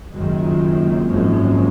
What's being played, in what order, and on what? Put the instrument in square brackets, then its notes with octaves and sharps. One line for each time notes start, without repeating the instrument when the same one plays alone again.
[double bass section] F#1 F#2 D#3 G#3 [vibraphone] F#4
[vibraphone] F4
A#3
C4
[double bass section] G#1 F#2 F3 G#3 [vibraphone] C#4
[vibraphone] D#4
C#4
D#4